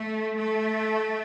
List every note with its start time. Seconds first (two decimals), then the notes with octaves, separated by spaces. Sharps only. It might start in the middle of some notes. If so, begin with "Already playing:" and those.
Already playing: A3
0.37 A3